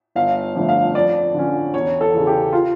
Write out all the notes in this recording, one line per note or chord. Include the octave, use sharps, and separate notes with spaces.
G1 F5
F2 D3 A3
F5
F2 D5
D3 F3 C#4
E1 C#5
A4
E2 C#3
G4
F4